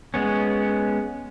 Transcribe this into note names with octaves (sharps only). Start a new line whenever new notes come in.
G#3 B3 C#4